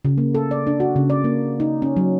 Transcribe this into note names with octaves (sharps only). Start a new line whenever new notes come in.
C#3
A#3
A4
D5
D4
F#4
C#3
D5
A#3
D#4
C#4
F#3